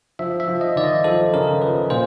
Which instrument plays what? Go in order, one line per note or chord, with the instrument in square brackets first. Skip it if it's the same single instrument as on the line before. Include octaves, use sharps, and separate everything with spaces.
[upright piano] F3 [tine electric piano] E5
[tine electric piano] E5
[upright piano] F3
[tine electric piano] D#5
[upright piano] D#2 [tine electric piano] D5
[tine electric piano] D#5
[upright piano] F3 [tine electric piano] A4
[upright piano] C#3 [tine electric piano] A#4
[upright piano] F3 [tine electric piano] B4
[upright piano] A#2 [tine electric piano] C5